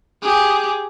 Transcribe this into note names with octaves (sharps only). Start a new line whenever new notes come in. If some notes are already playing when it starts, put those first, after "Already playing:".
G4 G#4